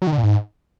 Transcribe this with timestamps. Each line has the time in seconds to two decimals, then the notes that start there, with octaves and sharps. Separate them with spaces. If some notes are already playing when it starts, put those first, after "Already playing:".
0.02 F#3
0.07 D#3
0.12 D3
0.18 A#2
0.23 G#2